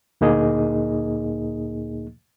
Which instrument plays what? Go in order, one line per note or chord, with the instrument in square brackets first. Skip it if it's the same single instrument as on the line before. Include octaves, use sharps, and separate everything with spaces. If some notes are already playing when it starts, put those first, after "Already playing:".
[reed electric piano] D2 A#2 A#3 D#4 G#4 D#5